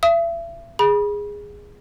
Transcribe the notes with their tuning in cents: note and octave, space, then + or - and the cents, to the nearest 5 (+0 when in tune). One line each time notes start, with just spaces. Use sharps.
E5 +40 D#6 +25
G#4 -10 B5 -30